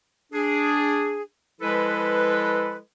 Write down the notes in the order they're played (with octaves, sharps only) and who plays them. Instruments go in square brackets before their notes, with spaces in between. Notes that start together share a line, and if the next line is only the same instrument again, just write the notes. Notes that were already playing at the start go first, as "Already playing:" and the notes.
[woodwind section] D4 G#4
F3 G#3 E4 A4 B4